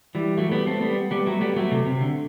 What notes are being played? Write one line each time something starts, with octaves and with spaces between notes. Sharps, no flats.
E3 G3
F#3 A3
G3 B3
A3 C4
G3 B3
G3 B3
F#3 A3
G3 B3
F#3 A3
C3
C3
D3